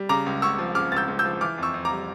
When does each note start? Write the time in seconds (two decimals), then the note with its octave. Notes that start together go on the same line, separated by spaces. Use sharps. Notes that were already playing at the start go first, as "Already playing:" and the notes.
Already playing: G3
0.09 C#3 A#5 D6
0.26 C#2
0.42 C#2 C#6 E6
0.58 F3
0.75 C#3 D6 F6
0.92 C#2 A6
0.97 E6 G6
1.08 C#2
1.19 E6 G6
1.25 F3
1.41 E3 D6 F6
1.58 F2 C#6 E6
1.74 F2
1.85 A#5 D6
1.91 G3